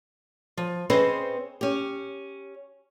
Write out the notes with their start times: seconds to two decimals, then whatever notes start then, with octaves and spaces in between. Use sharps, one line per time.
0.57 F3
0.90 C4 C#4 G#4 B4 C5 D#5
1.61 C#4 G4